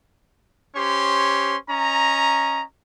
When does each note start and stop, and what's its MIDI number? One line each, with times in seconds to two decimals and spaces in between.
0.76 1.57 61
0.76 1.57 67
0.76 1.57 72
0.76 1.57 73
0.76 1.57 84
1.70 2.63 61
1.70 2.63 75
1.70 2.63 82